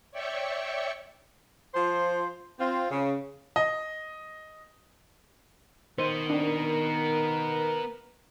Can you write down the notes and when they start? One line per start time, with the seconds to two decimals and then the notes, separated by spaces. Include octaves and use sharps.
0.11 C#5 D5 E5 G5 C#6
1.74 F3 F4 C5
2.59 C4 F4
2.90 C#3
3.56 D#5
5.98 D#3 B3 C5 D#5
6.30 C4 D4 A#4